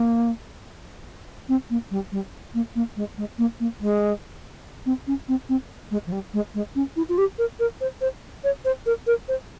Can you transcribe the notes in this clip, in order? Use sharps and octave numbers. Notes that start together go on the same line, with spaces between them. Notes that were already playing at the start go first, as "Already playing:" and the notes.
Already playing: A#3
C4
A#3
G3
G3
A#3
A#3
G#3
G#3
A#3
A#3
G#3
C4
C#4
C4
C4
G#3
F3
G3
G#3
G#3
C#4
E4
F4
G4
A#4
A#4
C5
C5
C#5
C5
A#4
A#4
C5